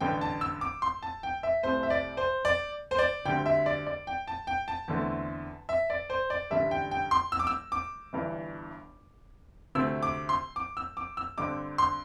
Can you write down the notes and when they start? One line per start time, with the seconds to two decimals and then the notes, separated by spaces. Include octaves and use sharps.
0.01 A1 G2 D3 G5
0.21 A5
0.41 E6
0.61 D6
0.82 C6
1.03 A5
1.23 G5
1.43 E5
1.63 C2 C3 A3 C5
1.83 E5
1.90 D5
2.17 C5
2.45 D5
2.91 C5
2.99 D5
3.26 D2 D3 G3 C4 G5
3.46 E5
3.66 D5
3.87 D5
4.07 G5
4.28 A5
4.47 G5
4.68 A5
4.88 E2 D3 A3 C4
5.69 E5
5.90 D5
6.10 C5
6.30 D5
6.50 A1 G2 D3 G3 E5
6.71 G5
6.91 G5
7.11 C6
7.32 E6
7.39 D6
7.47 E6
7.72 D6
8.13 G1 G2 E3
9.75 D2 C3 A3 C4 E6
10.02 D6
10.29 C6
10.56 D6
10.77 E6
10.97 D6
11.17 E6
11.38 G2 D3 C4 D6
11.78 C6